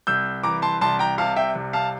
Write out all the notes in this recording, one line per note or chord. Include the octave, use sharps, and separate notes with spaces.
C2 E6 G6
E3 A#5 D6
A5 C6
C2 A5 C6
G5 A#5
C3 F5 A5
E5 G5
C2
F5 A5